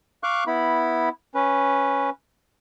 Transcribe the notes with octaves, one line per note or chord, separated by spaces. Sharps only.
F5 C#6 D6 F#6
B3 E4 B5
C#4 B4